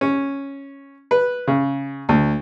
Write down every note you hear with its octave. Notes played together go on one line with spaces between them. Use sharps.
C#4
B4
C#3
D2